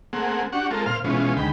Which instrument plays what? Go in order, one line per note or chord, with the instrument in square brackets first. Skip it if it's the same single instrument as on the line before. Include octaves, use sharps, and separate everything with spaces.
[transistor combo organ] A3 A#3 C4 G#4 F#5
D4 F#4 G4 F#5 C#6
G#3 C4 F4 A4 A#4
A#2 C5 F5 F6
B2 E3 G#3 C#4 F4
D2 D#3 G#3 G5 B5